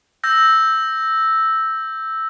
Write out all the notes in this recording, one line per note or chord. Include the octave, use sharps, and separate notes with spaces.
E6 G6 A#6